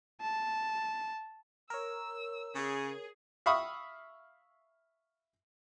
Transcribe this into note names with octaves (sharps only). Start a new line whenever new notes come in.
A5
A#4 C#5 E6
C#3 G#4
E5 F5 B5 C#6 D#6